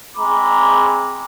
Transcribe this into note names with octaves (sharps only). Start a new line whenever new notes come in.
G#3 C4 A#5 B5 D6